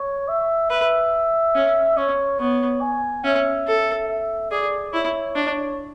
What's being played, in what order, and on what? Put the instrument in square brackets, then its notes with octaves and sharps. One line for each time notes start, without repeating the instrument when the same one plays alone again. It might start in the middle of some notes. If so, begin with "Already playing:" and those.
Already playing: [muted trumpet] C#5
E5
[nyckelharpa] B4 [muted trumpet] E5
[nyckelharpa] C#4
[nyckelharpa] C#4 [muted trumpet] C#5
[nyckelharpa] B3 [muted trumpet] C#5
[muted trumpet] G#5
[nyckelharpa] C#4 [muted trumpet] E5
[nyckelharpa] A4
[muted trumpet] E5
[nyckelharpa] G#4 [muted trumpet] D5
[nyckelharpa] E4 [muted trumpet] C#5
[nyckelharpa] D4